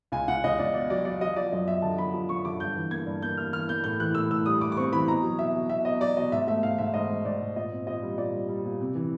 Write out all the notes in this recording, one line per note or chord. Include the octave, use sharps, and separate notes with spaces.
C#2 G#5
C#2 F#5
C#2 D#5
C#2 D5
B2 D5
F#3 D5
F#3 D5
F#3 D#5
F3 D5
F#2 D#5
F#2 E5
D3 A5
F3 B5
F3 B5
F#2 C#6
D3 D6
G2 G6
E3
A#3 G#6
G2
A#3 G6
A#3 F6
E3 F6
A#3 G6
A2 G6
E3 F#6
A2 E6
A2 E6
G3 D#6
G3 D6
D6
C4 C#6
E3 B5
B2 A#5
F#3
B2 E5
B2
B2 E5
B2 D#5
F#3 D5
B2 D#5
G#2 E5
A3 E5
G#2 F5
G#2 E5
G#2 D#5
G#2
G#2 D5
G#2
A#2 D#5
C4
A#2 D#5
G3
A#2 D5
G3
G3
A#2
C3
E3